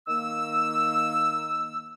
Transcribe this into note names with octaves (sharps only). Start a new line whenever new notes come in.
D#3 A#3 E6